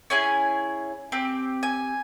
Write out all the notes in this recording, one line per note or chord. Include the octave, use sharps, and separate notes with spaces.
C#4 E4 G#4 G#5
C4 G4
G#5